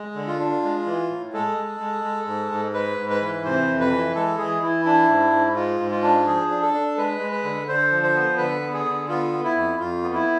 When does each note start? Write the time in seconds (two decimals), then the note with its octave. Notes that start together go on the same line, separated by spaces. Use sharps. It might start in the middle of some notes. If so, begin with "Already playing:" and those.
Already playing: G#3
0.15 D3
0.27 F4
0.40 D4
0.63 G#3
0.86 E3
1.10 A2
1.33 G#3 A4
1.57 G#3
1.80 G#3
2.04 G#3
2.27 G#2
2.51 G#2
2.74 G#3 B4
2.98 G#2
3.10 B4
3.21 E3
3.44 C3 C5
3.68 F2
3.80 B4
3.92 E3
4.15 G#3 A4
4.38 E3 G#4
4.62 E3 E4
4.85 D4 E4
5.09 G#2
5.32 G#2
5.56 G#3 F4
5.80 G#2
5.91 F4
6.03 D4
6.27 F3 G#4
6.50 D4
6.62 A4
6.74 D4
6.98 G#3 B4
7.20 G#3
7.32 B4
7.43 D3
7.68 D3 C5
7.91 F3
8.03 C5
8.15 B3
8.37 D3 B4
8.61 B3
8.73 G#4
8.86 D3
9.08 B3 F4
9.33 B3
9.44 E4
9.55 F2
9.78 F2 F4
10.03 B3
10.14 E4